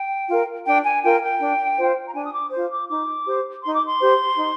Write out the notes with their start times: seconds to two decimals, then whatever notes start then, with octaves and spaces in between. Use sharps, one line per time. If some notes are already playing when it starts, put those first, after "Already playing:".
Already playing: G5
0.28 F4 A#4
0.66 D4 G5
0.85 G#5
1.03 F4 A#4 G5
1.22 G5
1.40 D4
1.78 F4 C5
2.08 A#5
2.15 D4 G#5
2.25 D#6
2.33 D6
2.52 F4 C5
2.71 D6
2.89 D#4 D6
3.26 G4 C5
3.63 D#4 C6
3.74 D6
3.87 C6
4.01 G4 C5
4.37 D#4